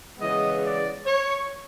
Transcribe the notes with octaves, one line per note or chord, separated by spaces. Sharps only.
C#3 E3 G#3 B3 D#5
D5
C#5